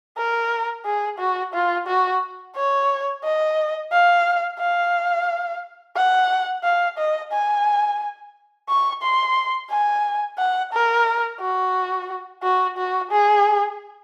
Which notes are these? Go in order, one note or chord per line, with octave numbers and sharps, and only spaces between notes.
A#4
G#4
F#4
F4
F#4
C#5
D#5
F5
F5
F#5
F5
D#5
G#5
C#6
C6
G#5
F#5
A#4
F#4
F#4
F#4
G#4